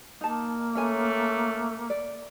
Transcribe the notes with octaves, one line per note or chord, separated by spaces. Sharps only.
A#3 D#4 A5
A3 C#4 C#5 G#5
D5